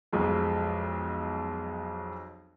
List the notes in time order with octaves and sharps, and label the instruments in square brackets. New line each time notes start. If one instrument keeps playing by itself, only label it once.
[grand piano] B1 F2 G#3